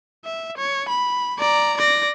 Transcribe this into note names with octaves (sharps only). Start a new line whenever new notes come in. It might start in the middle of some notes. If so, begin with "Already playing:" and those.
E5
C#5
B5
D5 A#5
D5 A#6